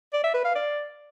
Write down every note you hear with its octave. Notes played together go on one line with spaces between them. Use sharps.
D5
E5
B4
F5
D5